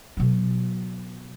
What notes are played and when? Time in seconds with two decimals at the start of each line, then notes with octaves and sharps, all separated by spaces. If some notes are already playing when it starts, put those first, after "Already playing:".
0.17 B2 F#3